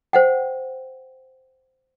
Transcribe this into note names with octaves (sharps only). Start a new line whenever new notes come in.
C5 F#5 G5